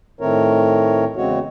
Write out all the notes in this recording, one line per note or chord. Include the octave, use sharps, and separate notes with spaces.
A2 D#3 A3 C4 A#4 C#5
E2 C#3 G#3 C4 F#4 C#5